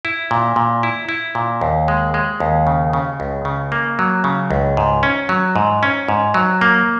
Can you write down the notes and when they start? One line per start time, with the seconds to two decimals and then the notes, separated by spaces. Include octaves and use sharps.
0.05 E4
0.31 A#2
0.56 A#2
0.83 E4
1.09 E4
1.35 A#2
1.61 D#2
1.88 G#3
2.14 G#3
2.40 D#2
2.67 C#3
2.93 C#3
3.20 C#2
3.45 C#3
3.72 A#3
3.99 F#3
4.24 C#3
4.51 C#2
4.77 G#2
5.03 C#4
5.29 F#3
5.56 G#2
5.83 C#4
6.09 G#2
6.34 F#3
6.61 A#3